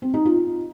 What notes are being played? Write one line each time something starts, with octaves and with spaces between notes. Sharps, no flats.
C4
D#4
F4